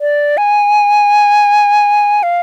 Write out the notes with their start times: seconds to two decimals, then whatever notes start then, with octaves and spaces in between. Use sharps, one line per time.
0.01 D5
0.37 G#5
2.23 F5